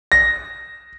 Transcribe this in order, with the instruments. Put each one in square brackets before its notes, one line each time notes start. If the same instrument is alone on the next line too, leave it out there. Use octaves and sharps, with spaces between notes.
[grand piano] A#6